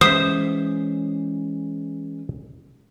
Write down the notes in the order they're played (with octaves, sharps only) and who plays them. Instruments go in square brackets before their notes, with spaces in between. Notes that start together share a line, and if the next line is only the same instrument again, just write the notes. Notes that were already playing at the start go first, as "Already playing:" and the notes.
[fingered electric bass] E3 G#3 C#4 [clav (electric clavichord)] C5 E5 [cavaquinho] D#6